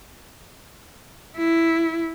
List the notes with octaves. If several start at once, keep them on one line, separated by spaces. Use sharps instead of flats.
E4